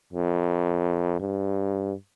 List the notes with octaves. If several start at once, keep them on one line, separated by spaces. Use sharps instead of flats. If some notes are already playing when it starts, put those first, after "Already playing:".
F2
G2